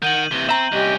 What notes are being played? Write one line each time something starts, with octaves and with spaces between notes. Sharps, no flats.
D#3 F#5 G6 D#7 F#7
C3 E3 C#6 G7
C4 E5 A#5
C2 C#4 G4 D#5